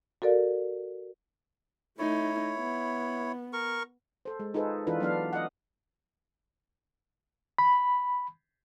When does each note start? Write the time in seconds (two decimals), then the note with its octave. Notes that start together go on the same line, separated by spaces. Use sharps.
0.22 F#4 A4 A#4 D5 F5
1.99 A3 D#4 E4 C#5
2.58 B3
3.53 A#4 C#6
4.25 A4 C5
4.40 G#3
4.54 D#4 F4 G#4 A4 B4 C5
4.87 E3 D4 F4 A4 B4
5.00 F#3 B3 D4 F5
5.33 D#5 F#5
7.58 B5